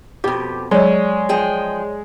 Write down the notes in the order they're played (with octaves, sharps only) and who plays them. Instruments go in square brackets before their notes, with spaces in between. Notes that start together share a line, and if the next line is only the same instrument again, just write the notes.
[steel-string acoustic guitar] F2 B2 [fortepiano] G4
[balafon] F#3 [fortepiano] G#3 [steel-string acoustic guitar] C#4 [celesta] C#5 D5
[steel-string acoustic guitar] F3 G#4 G5